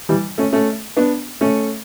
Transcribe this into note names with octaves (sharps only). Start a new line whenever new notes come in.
E3 G3
A3 C#4
A3 C#4
B3 D4
A3 C#4